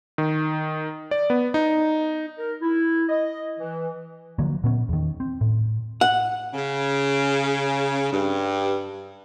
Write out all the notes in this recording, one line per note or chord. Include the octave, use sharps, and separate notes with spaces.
D#3
D5
B3
D#4
A#4
E4
D#5
E3
D3 F3 F#3 A#3
A#2 B3 C#4
E2 D#3
C4
A2
F#5
C#3
G2